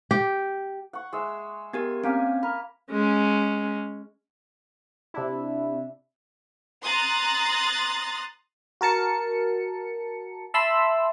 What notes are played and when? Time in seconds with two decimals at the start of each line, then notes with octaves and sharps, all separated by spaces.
0.11 G4
0.93 F#5 C#6
1.13 G#3 E5 E6
1.73 B3 G4 A#4 G#5
2.04 A#3 C4 C#4 F5 G#5
2.43 A#4 B5
2.91 G#3 C#4
5.14 C3 D4 E4
6.84 A#5 C6 D#6 F#6 A6
8.81 F#4 A#4 A5 C#7
10.54 E5 A5 B5 C6 E6